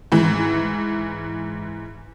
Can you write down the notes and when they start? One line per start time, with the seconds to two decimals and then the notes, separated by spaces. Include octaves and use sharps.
0.12 G#2 E3